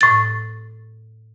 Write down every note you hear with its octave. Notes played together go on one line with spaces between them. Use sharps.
A2 A6